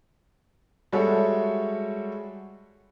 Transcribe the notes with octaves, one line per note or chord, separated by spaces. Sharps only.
G3 G#3 F#4 A4 C#5 E5